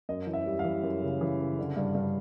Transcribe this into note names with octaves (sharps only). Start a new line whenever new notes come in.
F#2 D#5
E3
E5
G3
F5
E3
F#2
C#3
E3
C#3
D3
G2
G2